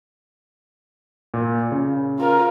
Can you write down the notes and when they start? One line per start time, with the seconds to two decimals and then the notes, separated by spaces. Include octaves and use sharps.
1.34 A#2
1.72 C#3
2.19 F4 A#4